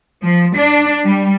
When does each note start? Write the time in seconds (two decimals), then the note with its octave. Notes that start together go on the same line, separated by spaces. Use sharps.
0.23 F3
0.55 D4
1.05 G3